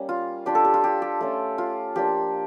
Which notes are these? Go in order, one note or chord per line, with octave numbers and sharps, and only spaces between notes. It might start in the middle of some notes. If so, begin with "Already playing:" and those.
Already playing: G3 A#3 C#4
F4
G3 D4 F4 G4
A4
G4
F4
G4
G4
A3 C#4 F4
F4
F3 A#3 D4 G4